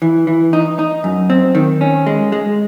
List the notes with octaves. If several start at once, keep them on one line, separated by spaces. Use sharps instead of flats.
E3
E3
D#4
D#4
F#2
C4
D#3
C#4
G#3
G#3